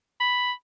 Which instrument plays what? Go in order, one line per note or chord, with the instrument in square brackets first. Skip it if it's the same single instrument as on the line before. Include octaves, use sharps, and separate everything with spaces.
[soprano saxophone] B5